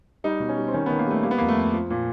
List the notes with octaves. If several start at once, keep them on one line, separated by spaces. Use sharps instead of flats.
G3 D#4
B2
C#4
G3
C4
D#3 C#4
D#3 B3
A#3
G3 A3
G3 A#3
B3
F2 A#3
A3
F2
F3
A#2